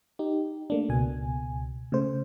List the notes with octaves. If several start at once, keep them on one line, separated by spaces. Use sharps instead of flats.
D#4 G4
A3 A#3 D4
C#2 B2 G#5
C#3 A3 C5